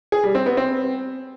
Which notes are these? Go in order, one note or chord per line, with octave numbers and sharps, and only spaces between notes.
G#4
G3
C4
B3
C4